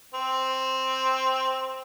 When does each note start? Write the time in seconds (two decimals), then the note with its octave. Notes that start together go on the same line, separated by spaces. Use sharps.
0.14 C4